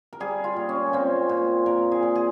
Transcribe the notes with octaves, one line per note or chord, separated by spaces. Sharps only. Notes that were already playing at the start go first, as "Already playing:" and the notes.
A#4
G3 G#4
F4
A#2
C#4
A#2 C4
A#2
A#2 A#4
G#4
A#2
G#4